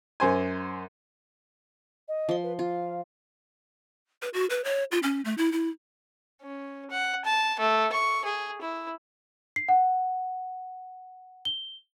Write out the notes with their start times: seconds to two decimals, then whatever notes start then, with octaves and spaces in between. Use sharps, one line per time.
0.20 F#2 C5 G#5
2.08 D#5
2.29 F3 C6
2.43 B4
2.59 F4 F5
4.22 B4
4.34 F#4
4.50 B4
4.64 C#5
4.92 F4
5.03 C#4
5.25 A3
5.38 E4
5.52 E4
6.42 C#4
6.90 F#5
7.25 A5
7.59 A3
7.92 C#6
8.25 G#4
8.61 E4
9.56 C7
9.69 F#5
11.45 G7